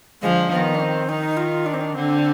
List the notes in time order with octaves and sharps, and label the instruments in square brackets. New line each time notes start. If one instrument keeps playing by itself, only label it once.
[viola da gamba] D3 F3 [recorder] G#3
[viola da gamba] D#3 [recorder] B3
[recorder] D4
C4
[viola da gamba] D#3 [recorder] D#4
[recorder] F4
D4
C4
D4
[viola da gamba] D3 [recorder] C4